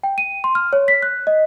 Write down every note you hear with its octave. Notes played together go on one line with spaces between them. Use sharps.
G5
D#7
C6
F6
C#5
B6
F#6
D#5